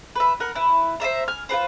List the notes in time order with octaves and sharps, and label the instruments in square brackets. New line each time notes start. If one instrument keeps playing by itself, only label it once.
[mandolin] B4 E5
A#4 F#5
E4 B4
C5 D#5 E5 A#5
G#5 F6
F4 G4 B4 C5